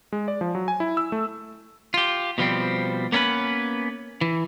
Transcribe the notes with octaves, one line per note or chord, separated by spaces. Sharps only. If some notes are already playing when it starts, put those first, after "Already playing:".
G#3
D5
F3
F#3
G#5
E4
E6
A3
F4 G4
B2 F3 G3 C4
A#3 B3 C#4 A#4 B4
E3